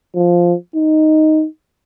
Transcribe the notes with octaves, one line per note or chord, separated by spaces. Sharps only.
F3
D#4